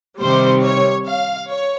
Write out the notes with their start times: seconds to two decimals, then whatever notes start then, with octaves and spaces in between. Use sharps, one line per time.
0.20 C3 D#3 G3 C5
0.63 C#5
1.06 F5
1.48 C#5